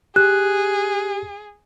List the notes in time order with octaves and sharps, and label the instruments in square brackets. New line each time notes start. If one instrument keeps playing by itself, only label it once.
[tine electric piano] G4 [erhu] G#4 [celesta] F#6